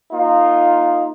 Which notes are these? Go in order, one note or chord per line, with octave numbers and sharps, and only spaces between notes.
A#3 D#4 F4